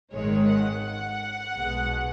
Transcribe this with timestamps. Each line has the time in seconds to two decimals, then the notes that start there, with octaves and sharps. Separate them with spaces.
0.12 G#1 G#2 D#3 G#3 C#5
0.49 F#5
0.84 F#5
1.56 B1 B2 G#3